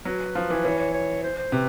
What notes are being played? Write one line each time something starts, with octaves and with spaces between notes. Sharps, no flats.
F#3 B4
F3
E3
E3 C#5
C#5
C#5
C5
C5
C3 B4